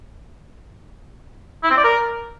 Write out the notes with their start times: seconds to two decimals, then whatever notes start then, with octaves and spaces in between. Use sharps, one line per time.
1.64 E4
1.70 C4
1.77 D5
1.84 A#4